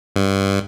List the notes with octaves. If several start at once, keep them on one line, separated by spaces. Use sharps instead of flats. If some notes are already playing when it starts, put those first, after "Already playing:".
G2